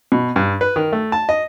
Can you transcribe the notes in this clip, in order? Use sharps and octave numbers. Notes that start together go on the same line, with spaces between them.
B2
G2
B4
D#3
A3
A5
D#5